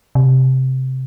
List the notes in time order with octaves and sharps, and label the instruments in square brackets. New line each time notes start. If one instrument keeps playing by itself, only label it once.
[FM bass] C3